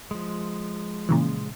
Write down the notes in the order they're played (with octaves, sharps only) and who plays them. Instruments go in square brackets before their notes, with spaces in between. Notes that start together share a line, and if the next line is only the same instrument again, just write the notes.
[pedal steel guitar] F3 G#3
[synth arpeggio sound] A#2 C#3 E3